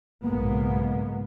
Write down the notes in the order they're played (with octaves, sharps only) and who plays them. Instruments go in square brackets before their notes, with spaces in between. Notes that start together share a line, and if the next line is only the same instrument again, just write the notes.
[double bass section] B1 G#2 C#3 G#3 A#3 B3